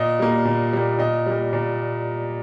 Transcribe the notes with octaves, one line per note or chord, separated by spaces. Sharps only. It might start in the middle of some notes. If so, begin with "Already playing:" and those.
Already playing: A#2 D#5
G3 A#3
A#2
G3 A#3
A#2 D#5
G3 A#3
A#2